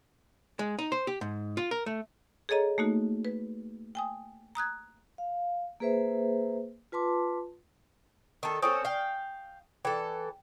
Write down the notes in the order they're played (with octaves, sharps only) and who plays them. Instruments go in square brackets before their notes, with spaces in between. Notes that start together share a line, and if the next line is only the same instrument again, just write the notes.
[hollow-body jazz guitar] G#3
D#4
C5
G4
G#2
F4
A#4
A3
[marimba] G#4 A4 C#5 D#5 A#5
A3 A#3 D#4 F#4
B4
G5 G#5 D#6
A#5 D#6 F#6 G#6
[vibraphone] F5
A#3 G#4 B4 C5 E5
F4 B4 A5 C6 D6
[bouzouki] D#3 A4
[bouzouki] C4 C#4 A4 [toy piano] G#5 C#6 D#6
[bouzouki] F5 G5
[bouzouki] E3 A4 [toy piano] G5